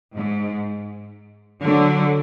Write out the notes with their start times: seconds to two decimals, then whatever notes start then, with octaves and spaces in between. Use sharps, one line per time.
0.14 G#2
1.62 D3 F#3